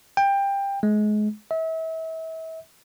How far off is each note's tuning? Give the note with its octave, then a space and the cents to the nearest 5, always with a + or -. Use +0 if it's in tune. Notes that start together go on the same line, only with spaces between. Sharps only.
G5 +20
G#3 +30
E5 -35